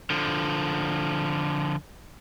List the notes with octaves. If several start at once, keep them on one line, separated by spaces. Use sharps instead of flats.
D3 F3